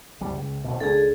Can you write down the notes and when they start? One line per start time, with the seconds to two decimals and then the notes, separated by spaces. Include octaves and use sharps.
0.21 F#1 C2 G3
0.33 C#2
0.64 D1 G1 B2
0.80 C#2 D4 G#4 A4